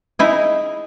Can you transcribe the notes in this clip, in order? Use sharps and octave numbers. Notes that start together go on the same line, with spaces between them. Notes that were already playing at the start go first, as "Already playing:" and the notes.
D#4 E4 G#4